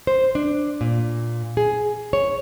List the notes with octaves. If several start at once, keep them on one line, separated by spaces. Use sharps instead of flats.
C5
D4
A#2
G#4
C#5